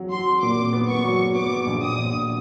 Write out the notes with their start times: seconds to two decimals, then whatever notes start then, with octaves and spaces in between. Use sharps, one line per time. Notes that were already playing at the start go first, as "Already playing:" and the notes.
Already playing: F#3
0.11 F#3 C6
0.42 A#2 D6
0.73 B3
0.88 C#6
1.04 F#3
1.35 B3 D6
1.67 A#1
1.83 D#6
1.98 A#1